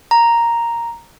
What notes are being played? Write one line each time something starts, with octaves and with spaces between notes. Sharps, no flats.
A#5